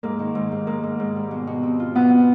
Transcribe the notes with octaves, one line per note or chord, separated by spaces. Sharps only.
G#2 A#3
D#3
G#2
G#2
G#2 A#3
G#2
G#2
G3
B2
B2
C4
F4
B2 B3
F4